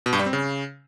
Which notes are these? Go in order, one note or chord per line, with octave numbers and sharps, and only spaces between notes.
B2
G2
G3
C4
C#3